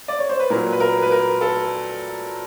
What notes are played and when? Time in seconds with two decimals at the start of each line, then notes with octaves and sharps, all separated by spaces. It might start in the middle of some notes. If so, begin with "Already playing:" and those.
0.08 D5
0.19 C#5
0.29 C5
0.39 B4
0.50 A#2 F#3 A#4
0.72 B4
0.80 A#4
1.02 B4
1.11 A#4
1.41 A4